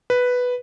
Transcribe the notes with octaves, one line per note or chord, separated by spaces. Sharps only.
B4